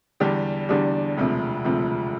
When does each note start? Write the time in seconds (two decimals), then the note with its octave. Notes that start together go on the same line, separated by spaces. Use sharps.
0.20 E2 D3 G3 D4 G4
0.69 E2 D3 G3 D4 G4
1.17 E1 D2 C3 F3
1.64 E1 D2 C3 F3